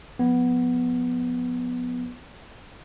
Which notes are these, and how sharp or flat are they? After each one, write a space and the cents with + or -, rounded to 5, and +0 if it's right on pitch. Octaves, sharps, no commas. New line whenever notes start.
F3 +25 B3 +0